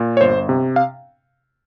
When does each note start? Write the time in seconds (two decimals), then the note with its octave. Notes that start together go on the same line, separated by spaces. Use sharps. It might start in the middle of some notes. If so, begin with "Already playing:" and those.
Already playing: A#2
0.17 C#5
0.21 G1 C5
0.49 C3
0.76 F5